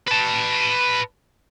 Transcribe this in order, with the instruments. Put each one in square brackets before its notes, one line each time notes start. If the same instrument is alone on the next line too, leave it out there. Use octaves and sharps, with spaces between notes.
[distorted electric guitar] B4 A5